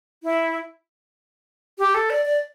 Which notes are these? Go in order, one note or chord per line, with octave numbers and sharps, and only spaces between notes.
E4
G4
A4
D5
D5